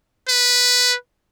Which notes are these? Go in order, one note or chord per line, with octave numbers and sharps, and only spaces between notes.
B4